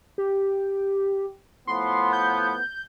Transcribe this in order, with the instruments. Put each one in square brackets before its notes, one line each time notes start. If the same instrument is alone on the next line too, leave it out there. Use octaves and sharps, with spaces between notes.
[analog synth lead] G4
[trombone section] A2 F3 B3 [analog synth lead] C6
[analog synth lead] G6